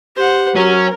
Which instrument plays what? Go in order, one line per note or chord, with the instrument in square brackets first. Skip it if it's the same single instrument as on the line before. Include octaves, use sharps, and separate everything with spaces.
[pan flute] G4 [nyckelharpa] C5 F#5
[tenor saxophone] F#3 [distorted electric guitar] C#4 [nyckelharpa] A#4